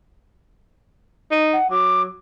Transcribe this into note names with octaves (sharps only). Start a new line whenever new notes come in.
D#4
F#5
F#3 D6